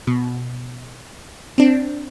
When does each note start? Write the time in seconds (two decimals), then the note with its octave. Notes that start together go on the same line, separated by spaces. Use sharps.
0.07 B2
1.58 C4 D4